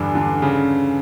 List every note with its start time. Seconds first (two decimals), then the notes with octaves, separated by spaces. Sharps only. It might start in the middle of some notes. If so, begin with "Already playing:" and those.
Already playing: E2 G2 D3
0.15 D3
0.42 C#3